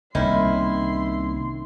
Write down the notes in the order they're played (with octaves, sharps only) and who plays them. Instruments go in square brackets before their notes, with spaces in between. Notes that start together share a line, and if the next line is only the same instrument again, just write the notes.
[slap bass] C2 A#3 [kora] D#3 C#4 [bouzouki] E4 [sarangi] C6